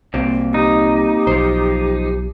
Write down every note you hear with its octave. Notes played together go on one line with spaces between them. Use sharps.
C2 A#2 C4
D#4 G4
B1 F3 C5